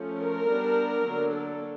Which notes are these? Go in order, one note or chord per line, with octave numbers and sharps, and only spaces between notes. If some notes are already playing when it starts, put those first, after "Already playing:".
Already playing: F3 A3 C#4
A#4
G3 B3 D4
D3 F#3 A#3 D4
A4